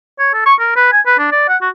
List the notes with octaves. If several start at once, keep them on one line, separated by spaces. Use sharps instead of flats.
C#5
A4
C#6
A#4
B4
G#5
B4
D4
D5
F#5
F#4